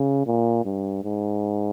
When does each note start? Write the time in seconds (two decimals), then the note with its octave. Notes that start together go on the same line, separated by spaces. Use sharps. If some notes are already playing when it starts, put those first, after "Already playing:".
Already playing: C#3
0.27 A#2
0.65 G2
1.04 G#2